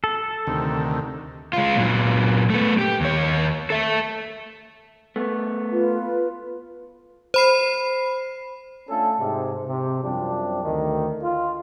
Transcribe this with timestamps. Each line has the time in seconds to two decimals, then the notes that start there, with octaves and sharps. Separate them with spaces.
0.04 A4
0.47 D2 C3 D#3
1.53 G#3 F4
1.76 A#2 F#3
2.50 A3 B3
2.78 G4
3.01 D#2 C#5
3.70 A4 E5
5.16 A3 B3
5.72 F4 B4
7.34 C5 B5 C7
8.89 A3 C#4 D4 F4 A4
9.19 G#2 C3
9.66 C3
10.03 F#2 C3 F3 G3 C4 D4
10.64 D2 D#3
11.22 F4